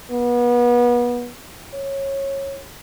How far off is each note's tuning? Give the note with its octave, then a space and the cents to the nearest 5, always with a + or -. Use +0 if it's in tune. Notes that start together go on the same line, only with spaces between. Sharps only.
B3 -30
C#5 -20